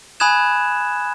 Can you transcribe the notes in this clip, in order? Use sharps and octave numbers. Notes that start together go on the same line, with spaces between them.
G#5 B5 D#6 F#6 G#6 E7